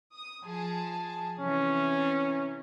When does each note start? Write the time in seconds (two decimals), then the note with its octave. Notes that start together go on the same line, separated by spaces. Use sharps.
0.13 D#6
0.44 F3 G#4 A5
1.39 C3 E3 C#4